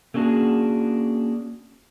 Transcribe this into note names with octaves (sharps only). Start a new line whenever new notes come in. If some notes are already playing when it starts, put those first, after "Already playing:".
A3 A#3 C#4 D4 F#4 G#4